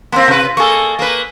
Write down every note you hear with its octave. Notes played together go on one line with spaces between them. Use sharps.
A#3 C4 F4 F#4 C5
C3 B4
A#3 G#4 A4 D#5 C#6
A#3 B4